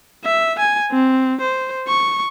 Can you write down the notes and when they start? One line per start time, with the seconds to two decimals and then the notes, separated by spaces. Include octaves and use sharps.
0.25 E5
0.59 G#5
0.92 C4
1.41 C5
1.88 C#6